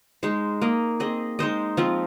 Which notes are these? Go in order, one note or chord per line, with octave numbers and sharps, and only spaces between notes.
G#3 D#4 C5
A#3 G#4 D#5
C4 G#4 D#5
G#3 D#4 C5 D#5
F3 C4 F4